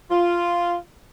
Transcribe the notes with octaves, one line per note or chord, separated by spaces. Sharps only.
F4